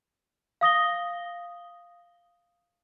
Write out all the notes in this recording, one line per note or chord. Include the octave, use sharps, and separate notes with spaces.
F5 D#6 A#6 G7